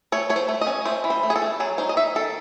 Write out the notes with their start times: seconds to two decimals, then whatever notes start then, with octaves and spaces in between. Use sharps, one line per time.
0.12 A3 C#5
0.30 A3 C#5
0.36 C5
0.49 A3
0.61 D#5
0.67 C#4
0.85 A3 C5
1.04 E3
1.10 C5
1.23 A3
1.30 G#4
1.36 A4
1.42 A3
1.60 F#3 G#4
1.78 D#4 C5
1.89 D#5
1.97 D#4 E5
2.15 D#3 A4